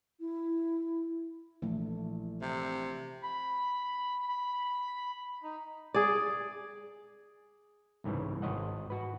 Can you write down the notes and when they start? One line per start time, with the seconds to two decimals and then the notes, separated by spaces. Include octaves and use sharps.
0.20 E4
1.62 A#1 E3 A3 E4
2.42 C3 E5
3.23 B5
4.28 B5
5.43 D#4
5.94 G#4 D5
8.04 C2 G#2 C#3 E3
8.42 G#1 C#5 D#5 F#5
8.90 F#4 B4